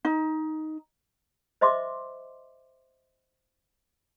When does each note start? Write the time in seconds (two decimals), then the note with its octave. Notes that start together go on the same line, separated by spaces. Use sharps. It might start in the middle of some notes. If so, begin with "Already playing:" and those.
0.05 D#4
1.61 C5 D#5 E5 C6 D6